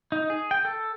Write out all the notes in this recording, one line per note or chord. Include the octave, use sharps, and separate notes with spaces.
D#4
G#4
G5
A4